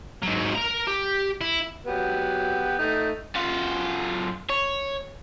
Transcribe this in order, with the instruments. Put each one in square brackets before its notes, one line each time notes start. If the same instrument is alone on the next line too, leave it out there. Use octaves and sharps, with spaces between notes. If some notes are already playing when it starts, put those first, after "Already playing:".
[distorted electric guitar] G#2 F#3
A#4 A#5
G4
E4
[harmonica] F#3 B3 G4
A3 D#4
[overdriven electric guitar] F#2 F4
C#5